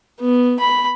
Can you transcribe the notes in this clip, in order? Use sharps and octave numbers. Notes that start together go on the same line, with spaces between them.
B3
B5